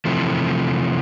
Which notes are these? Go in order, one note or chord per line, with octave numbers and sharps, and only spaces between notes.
C3 E3 F3 A3